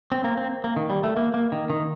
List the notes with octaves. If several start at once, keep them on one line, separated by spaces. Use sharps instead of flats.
C4
A#3
C4
A#3
D#3
G3
A3
A#3
A#3
D#3
D#3